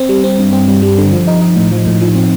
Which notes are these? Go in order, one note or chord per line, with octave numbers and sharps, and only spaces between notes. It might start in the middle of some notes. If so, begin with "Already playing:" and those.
Already playing: C4
G3
C4
G2
C4
G3
G3
D3
F3
D#4
D#4
A2
F3
A2
F3
C4